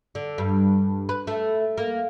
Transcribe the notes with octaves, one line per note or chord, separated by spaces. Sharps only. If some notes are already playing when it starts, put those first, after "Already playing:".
D3
G2
B4
A3
A#3